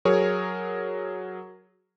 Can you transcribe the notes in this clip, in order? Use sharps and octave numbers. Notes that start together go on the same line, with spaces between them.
F#3 G#4 A#4 C#5